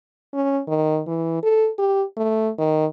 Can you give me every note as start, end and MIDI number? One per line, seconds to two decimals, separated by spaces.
0.33 0.61 61
0.67 1.01 51
1.07 1.42 52
1.42 1.69 69
1.79 2.03 67
2.17 2.50 57
2.58 2.86 51